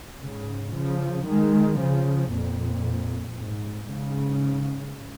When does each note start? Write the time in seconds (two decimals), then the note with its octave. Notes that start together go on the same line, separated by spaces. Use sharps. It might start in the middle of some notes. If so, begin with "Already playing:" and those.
0.23 G#2 C#3
0.75 C#3 F3
1.27 D#3 G#3
1.79 C#3 F3
2.31 F2 A#2
3.35 G#2
3.87 G#2 C#3